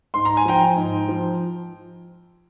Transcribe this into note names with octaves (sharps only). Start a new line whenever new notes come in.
G#2 C6
A#5
G#5
F3 G5 A#5
G#2
F3